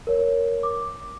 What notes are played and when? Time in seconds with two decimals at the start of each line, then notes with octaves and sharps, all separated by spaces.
0.07 A#4 C#5
0.63 D6